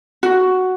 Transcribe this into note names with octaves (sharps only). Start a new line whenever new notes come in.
F#4